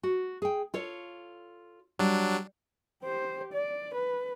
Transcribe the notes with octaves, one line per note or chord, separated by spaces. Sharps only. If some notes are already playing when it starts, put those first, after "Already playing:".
F#4
G#4 G5
F4 A4 C#5
F#3 G3 D4
G4 C5
D5
B4